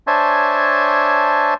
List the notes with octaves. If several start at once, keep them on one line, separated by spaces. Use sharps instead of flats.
D4 C5 C#5 E5 G#5 A5